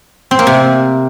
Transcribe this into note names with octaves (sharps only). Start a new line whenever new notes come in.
C4
A#3
C3